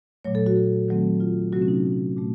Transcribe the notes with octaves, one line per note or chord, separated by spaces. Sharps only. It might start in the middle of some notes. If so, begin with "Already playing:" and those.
A#2 F#3 A3 C#5
A4
F#4
D#3 F#3 A3 C4
F4
C3 F#3 A3 C4 F#4
C#4
D#4
A#2 A3